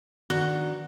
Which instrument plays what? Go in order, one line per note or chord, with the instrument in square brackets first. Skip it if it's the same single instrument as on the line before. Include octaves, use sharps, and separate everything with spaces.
[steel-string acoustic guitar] D#3 B3 D4 [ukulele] F#4